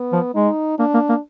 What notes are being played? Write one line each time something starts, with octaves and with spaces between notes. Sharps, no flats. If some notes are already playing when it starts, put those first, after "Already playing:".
Already playing: B3
F3
G#3 D#4
A#3 D4
A#3
A#3